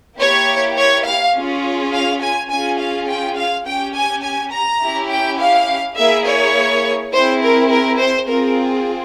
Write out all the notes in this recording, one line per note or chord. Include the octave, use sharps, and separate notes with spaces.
A#3 E4 G4 C#5
C#5
F5
C#4 F4 G#4
F5
G#5
C#4 F4 G#4 G#5
F5
G5
F5
C#4 G4 G5
G#5
G#5
A#5
C#4 E4 G4
G5
F5
A#3 E4 G#4 E5
C#5
C4 E4 G#4 C5
A#4
A#4
C5
C4 F4 G#4 A#4